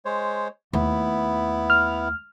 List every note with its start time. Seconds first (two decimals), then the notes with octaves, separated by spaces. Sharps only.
0.05 G#3 C5 C#5
0.73 D#2 A3 B3 E4
1.70 F6